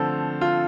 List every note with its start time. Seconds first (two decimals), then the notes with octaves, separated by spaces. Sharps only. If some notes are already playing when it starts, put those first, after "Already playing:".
Already playing: D3 F3 A3 C4 A4 C5
0.41 F4